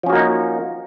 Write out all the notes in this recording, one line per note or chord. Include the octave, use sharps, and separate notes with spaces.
F3 A#3 C#4 D#4 F#4